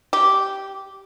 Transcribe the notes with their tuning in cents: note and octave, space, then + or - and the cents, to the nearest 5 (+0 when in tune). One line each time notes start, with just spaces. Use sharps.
G4 -10